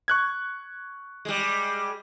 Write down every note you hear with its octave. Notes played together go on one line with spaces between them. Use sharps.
C#6 F#6 G#6
G3 G#3